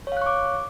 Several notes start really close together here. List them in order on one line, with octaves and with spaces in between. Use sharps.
C#5 F5 F#6 C#6 D6